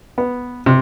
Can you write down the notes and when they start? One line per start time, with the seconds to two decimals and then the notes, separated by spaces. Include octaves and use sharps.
0.18 B3
0.66 C3